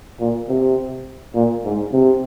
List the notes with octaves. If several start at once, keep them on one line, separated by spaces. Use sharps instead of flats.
A#2
C3
A#2
G#2
C3